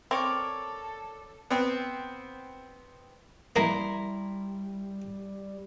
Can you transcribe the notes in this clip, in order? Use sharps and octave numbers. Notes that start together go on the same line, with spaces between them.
C4 A4 A#4 C#5 D5
B3 C4
G3 A#3 E4 D#5 A#5 C6